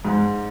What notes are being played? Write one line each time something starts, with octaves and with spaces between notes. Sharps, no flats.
G#2